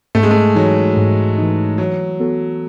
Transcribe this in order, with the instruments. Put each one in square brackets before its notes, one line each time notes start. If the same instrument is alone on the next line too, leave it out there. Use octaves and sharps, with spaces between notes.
[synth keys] G#2 [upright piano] A3
[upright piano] G#3
A3
[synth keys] E3 A3 D#4 [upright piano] F#3
[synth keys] G#2
E3 A3 D#4
[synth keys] E3 [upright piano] F#3
[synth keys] B3 F#4 A4